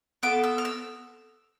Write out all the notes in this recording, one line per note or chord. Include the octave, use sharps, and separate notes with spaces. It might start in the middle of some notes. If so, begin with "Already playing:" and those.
B3 F4 A4 D6
E6
F6
E6